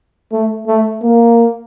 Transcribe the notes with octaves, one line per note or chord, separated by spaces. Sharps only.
A3
A3
A#3